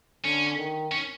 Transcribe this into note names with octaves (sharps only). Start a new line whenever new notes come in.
D3 C#4
D#3
C#4